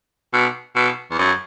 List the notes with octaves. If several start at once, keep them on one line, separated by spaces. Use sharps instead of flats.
B2
B2
E2
F#2